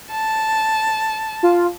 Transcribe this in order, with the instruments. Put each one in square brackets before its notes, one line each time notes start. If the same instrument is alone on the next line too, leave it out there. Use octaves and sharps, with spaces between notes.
[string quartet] A5
[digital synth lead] F4